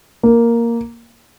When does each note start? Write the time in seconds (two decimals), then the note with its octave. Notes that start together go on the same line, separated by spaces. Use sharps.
0.23 A#3